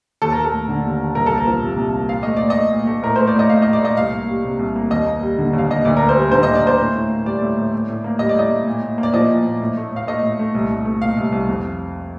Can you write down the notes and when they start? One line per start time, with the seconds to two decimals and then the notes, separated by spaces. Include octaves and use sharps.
0.22 D#2 A4
0.32 D#2 A#4
0.44 A4
0.53 A3
0.69 D3
0.84 D#2
1.00 D#2
1.15 C2 A#4
1.26 A#3 A4
1.38 A#4
1.46 F3
1.62 C3
1.78 C2
1.94 A#3
2.09 A#2 F5
2.23 A3 D#5
2.37 A#2 D5
2.50 D#5
2.56 A3
2.72 A#2
2.87 A3
3.03 A2 A#4
3.16 A3 C5
3.27 D5
3.35 A2 D#5
3.49 A3 F5
3.62 D#5
3.66 A2
3.73 D5
3.81 A3 D#5
3.97 C2 F5
4.13 A#3
4.28 G3
4.44 C3
4.59 C2
4.76 A#3
4.90 D#2 D#5
5.06 A#3
5.22 G3
5.38 D3
5.53 D#2 F5
5.70 A#3 D#5
5.85 D2 D5
5.97 A#3 A#4
6.09 C5
6.16 G3
6.31 D3 C5
6.43 D#5
6.48 D2
6.55 D5
6.63 A#3 C5
6.79 A2
6.95 A2
7.10 A#3
7.25 G3 D5
7.42 A2
7.58 A2
7.72 A2
7.89 A2
8.04 A#3
8.19 G3 D#5
8.29 D5
8.35 A2 D#5
8.51 A2
8.67 A#2
8.82 A#2
8.98 A#3
9.03 D5
9.14 F3 D#5
9.30 A#2
9.45 A#2
9.60 A2
9.77 A3
9.91 A2 F5
10.07 A3 D#5
10.23 A2
10.39 A3
10.55 C2
10.70 C2
10.85 A3
11.01 A#2 F5
11.17 C2
11.32 C2
11.49 F2